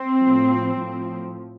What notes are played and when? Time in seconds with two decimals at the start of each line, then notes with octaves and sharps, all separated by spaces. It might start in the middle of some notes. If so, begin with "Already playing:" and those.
Already playing: C4
0.21 A2 F3
0.76 A2 F3